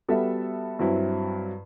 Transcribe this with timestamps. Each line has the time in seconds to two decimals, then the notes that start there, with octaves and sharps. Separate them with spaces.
0.08 G3 B3 F#4 A4 E5
0.79 G2 F#3 C4 E4